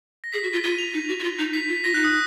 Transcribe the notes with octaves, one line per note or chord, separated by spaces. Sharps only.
A#6
G#4 B6
F#4
F4
F4 D#7
F7
D#4
F#4
F#4
F4
D#4
D#4 B6
F4
F4 A#6
D#4 F#6
D#6